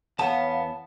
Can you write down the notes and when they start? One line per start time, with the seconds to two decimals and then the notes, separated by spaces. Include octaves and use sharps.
0.19 E2 B3 C#5 F5 A5